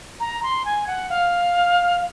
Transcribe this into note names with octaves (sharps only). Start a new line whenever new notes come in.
A#5
C6
G#5
F#5
F5